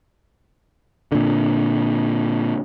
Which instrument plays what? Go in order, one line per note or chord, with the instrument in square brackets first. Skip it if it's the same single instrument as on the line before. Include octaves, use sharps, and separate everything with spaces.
[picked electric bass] A#2 D3